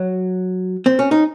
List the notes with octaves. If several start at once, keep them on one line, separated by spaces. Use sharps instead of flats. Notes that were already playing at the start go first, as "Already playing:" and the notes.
Already playing: F#3
C4
C#4
D#4